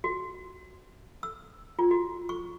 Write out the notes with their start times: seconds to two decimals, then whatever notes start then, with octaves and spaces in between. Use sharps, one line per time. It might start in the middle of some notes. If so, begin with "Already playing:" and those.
0.04 F#4
1.23 E6
1.79 F4
1.91 F#4
2.29 C#6